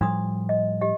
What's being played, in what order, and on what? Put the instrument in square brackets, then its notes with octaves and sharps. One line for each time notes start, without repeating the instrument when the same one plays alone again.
[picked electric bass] A2 F3 G3 [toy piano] D4 C6 D#6
[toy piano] D#5
G4 D#5